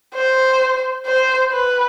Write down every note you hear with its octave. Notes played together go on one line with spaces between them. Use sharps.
C5
C5
B4